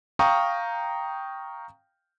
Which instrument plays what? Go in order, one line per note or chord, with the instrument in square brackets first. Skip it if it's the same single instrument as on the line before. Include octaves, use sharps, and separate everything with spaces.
[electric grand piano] F5 G5 A#5 C#6 D#6